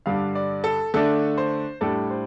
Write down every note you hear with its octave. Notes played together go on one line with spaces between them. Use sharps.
G2 D3 G3 D4 F5
D5
A4
D3 A3 D4 A4
C5
A2 G3 D4 A4
C5